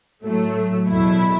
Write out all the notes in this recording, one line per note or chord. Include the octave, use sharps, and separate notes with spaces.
A2 F#3 A3
E2 B2 F#3 A3 E4